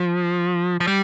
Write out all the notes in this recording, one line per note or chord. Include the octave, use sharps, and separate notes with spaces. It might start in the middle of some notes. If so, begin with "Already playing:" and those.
Already playing: F3
F3
G3